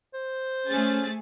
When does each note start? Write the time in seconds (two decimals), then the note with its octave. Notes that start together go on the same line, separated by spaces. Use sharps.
0.14 C5
0.67 A3 C#4 G#4 A6